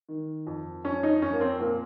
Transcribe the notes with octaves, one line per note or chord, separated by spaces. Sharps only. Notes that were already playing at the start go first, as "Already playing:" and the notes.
D#3
F2
F2 C#4
D#4
F2 C#4
A#3
C4
A#2 A#3